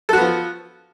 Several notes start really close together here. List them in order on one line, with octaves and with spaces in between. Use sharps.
A4 F#4 B3 F3